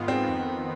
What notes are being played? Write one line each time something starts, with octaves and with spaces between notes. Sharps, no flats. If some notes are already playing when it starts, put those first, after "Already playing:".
Already playing: G#2 D#3 G#3 B3 F4
C4
F2 D#3 B3